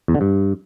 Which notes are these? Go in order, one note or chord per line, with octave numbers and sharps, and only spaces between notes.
E2
D3
G2